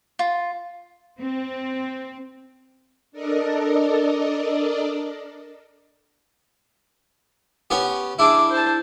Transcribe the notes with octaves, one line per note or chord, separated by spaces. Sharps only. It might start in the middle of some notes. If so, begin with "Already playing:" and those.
F4
C4
D4 A4 A#4 D5 D#5
B3 C#4 G4
D4 E4 G#4 D6
C5 A5